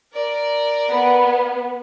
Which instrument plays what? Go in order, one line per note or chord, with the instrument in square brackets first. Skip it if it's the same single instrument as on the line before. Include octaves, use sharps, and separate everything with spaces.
[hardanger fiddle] A#4 D5
[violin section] B3